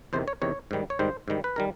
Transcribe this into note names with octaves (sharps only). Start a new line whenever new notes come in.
E2 C3 D#3 C5
C#5
E2 C3 D#3 C#5
G#2 D#3 G3
C#5
G#2 D#3 G3 C5
G#2 D#3 G3
B4
D#3 G3 A#4